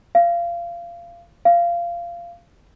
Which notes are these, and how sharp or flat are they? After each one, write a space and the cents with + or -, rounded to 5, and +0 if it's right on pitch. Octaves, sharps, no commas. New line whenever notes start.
F5 -25
F5 -20